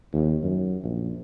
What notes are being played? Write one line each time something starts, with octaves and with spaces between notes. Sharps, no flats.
D#2
F#2
A#1